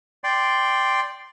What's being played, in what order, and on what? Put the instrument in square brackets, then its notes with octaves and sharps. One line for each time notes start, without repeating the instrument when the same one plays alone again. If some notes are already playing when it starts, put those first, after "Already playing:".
[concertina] D5 G5 C6